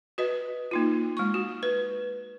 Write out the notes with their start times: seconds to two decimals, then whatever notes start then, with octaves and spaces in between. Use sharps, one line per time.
0.18 F#4 B4 D#5
0.71 A#3 D#4 F4
1.17 G#3 C#6
1.34 F#4
1.63 B4